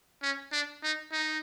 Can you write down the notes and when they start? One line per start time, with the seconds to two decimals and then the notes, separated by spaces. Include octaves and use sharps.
0.22 C#4
0.52 D4
0.83 D#4
1.12 D#4